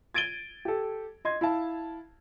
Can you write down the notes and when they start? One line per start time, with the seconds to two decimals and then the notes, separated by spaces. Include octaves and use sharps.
0.14 G#6 A6 D7 D#7 G7
0.65 G4 A4
1.25 D#5 C6 G#6
1.41 E4 F5 A5